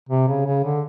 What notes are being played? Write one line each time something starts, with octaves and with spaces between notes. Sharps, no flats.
C3
C#3
C#3
D3